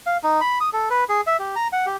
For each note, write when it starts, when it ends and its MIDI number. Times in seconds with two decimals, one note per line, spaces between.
0.06 0.17 77
0.23 0.41 63
0.41 0.59 83
0.60 0.69 87
0.73 0.89 69
0.90 1.04 71
1.09 1.21 68
1.27 1.37 76
1.39 1.55 67
1.56 1.68 82
1.73 1.86 78
1.86 1.97 67